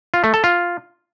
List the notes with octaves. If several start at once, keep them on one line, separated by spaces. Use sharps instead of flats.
F4
A3
A4
F4